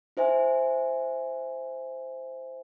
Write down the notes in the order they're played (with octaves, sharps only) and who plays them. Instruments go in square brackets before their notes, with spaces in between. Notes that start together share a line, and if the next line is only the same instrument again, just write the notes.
[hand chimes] E4 C5 E5 G#5